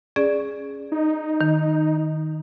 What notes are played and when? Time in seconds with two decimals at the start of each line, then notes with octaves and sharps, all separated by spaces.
0.16 C#4 G#4 D5
0.92 D#4
1.41 D#3